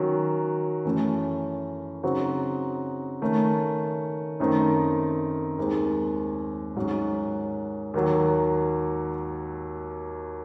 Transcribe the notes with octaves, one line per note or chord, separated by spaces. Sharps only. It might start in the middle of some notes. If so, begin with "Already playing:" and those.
Already playing: D#3 F#3 C#4 F#4
F#2 E3 A3 C#4
C#3 F#3 C4 D#4 F#4
D#3 A3 C#4
F#2 D#3 A3 C4 D#4
D#2 D#3 G#3 C4
G#2 F#3 C#4 F#4
D#2 D#3 F#3